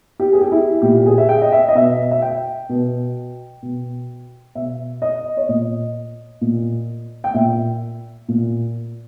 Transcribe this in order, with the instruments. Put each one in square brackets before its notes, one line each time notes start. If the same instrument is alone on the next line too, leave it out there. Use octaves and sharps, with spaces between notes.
[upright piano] G4
G#4
G4
E4
A#2 G4
G#4
E5
G5
D#5
E5
D#5
B2 E5
E5
G5
B2
B2
B2 E5
D#5
C#5
A#2 D#5
A#2
G5
A#2 E5
A#2